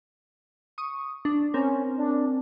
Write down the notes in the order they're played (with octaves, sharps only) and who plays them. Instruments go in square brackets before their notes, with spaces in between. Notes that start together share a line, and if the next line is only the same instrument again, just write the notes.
[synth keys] C#6 D#6
D4
[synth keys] C4 A#4 [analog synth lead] C#4
[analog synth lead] D4